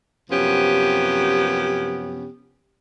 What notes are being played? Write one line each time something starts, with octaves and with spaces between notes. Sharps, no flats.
F#2 C3 F3 B3 C#4 G4